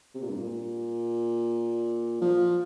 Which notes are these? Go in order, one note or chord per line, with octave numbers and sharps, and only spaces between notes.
C3
A#2
G2
A#2
F3